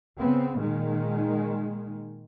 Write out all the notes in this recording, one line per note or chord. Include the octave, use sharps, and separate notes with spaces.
C#3 B3 C4
A#2 D#3 G#3